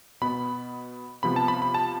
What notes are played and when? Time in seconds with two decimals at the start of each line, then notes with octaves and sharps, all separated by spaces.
0.21 B2 B3 B5
1.23 C3 F3 B3 B5
1.36 A5
1.48 B5
1.62 B5
1.74 A5